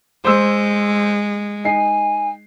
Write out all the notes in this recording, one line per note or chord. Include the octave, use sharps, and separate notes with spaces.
G#3 C5 E6
D#4 G#5 C7